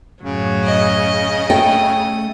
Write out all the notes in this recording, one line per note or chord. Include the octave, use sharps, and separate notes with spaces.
F#2 A2 C#3 F#3
D#5
A3 G5 D#6